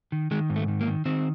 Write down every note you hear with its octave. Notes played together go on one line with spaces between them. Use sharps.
D#3
D#3 G#3
G#2
A3
D#3
A#3
D#3
D#3 C4